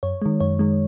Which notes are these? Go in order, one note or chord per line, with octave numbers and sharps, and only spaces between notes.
F#2 C#5
D#3 G#3
F#2 C#5
D#3 G#3